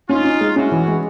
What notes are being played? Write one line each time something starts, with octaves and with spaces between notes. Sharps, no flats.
C#4 D#4 F4
C#4
G#3
C#4 E4 F#4
E3
G#3